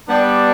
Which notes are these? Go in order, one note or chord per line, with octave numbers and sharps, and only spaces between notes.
G3 B3 D4